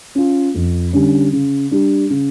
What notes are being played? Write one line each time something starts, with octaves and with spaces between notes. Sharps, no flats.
C#4 F4
F2
D3 G3 C#4
C#3
G3 D4
C#3